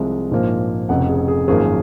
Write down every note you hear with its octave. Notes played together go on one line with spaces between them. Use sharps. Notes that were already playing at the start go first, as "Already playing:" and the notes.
Already playing: C2 C3 F3 G#3
A#1 G#2 F3 A#3
F1 F2 C#3 F#5
G#4
G#4
G#1 F#2 F3 A#3 G#4